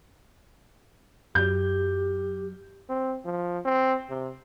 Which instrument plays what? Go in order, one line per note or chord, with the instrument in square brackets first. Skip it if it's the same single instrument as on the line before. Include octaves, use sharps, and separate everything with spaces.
[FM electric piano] F#2 F#3 [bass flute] G4 [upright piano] G6
[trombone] C4
F3
C4
C3